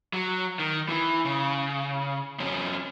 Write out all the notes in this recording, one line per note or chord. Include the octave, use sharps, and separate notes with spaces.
F#3
D#3
E3
C#3
F2 C#4